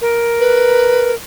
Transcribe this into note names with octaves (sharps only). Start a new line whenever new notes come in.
A#4
B4